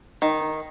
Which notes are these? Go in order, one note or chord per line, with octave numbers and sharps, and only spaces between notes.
D#3